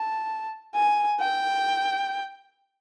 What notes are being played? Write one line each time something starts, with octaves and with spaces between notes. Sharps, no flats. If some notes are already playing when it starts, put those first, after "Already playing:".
Already playing: A5
G#5
G5